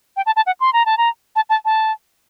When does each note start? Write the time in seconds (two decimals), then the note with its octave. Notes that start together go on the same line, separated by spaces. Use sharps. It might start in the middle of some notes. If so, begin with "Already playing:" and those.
0.16 G5
0.26 A5
0.36 A5
0.46 F#5
0.60 C6
0.73 A#5
0.86 A5
0.97 A#5
1.36 A5
1.49 A5
1.65 A5